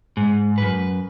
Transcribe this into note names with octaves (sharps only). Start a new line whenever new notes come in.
G#2
F#2 B4